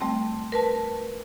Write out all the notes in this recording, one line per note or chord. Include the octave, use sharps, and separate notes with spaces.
G3 A3 C4
A#4 B4 A5